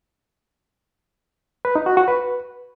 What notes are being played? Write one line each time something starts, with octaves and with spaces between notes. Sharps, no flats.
B4
D#4
F#4
F#4
B4